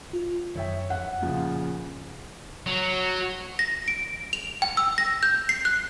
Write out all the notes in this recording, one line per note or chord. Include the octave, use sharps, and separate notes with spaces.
F4
F#2 D#3 C#5 E5 G5
F2 F#5
A#2 C#3 F3 F5
F#3
A#6
D7
F7
G5
E6
A#6
G6
C7
F#6